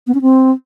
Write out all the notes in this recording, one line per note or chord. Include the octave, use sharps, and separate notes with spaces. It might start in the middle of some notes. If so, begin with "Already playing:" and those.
B3
C#4
C4